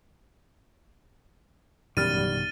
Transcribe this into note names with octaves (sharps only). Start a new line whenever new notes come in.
A1 F#2 B2 D#3 G3 F6 A6 D#7